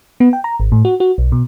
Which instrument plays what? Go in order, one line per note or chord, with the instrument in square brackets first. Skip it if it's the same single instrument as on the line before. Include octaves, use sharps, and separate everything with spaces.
[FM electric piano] B3
G5
A#5
G#1
A2
F#4
F#4
B1
B2